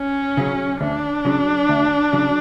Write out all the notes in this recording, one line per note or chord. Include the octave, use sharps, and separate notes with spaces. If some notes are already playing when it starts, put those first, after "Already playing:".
Already playing: C#4
C#3 F#3
D2 D4
C#3 F#3
D2
C#3 F#3